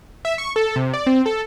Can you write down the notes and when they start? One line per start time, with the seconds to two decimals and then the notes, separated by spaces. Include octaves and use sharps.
0.25 E5
0.38 C#6
0.56 A4
0.76 C3
0.93 D5
1.07 C4
1.26 A4